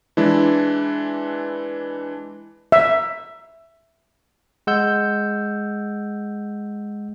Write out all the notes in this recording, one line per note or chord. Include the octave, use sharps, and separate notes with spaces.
E3 G#3 D4 E4
E5
G#3 F#5 E6 G6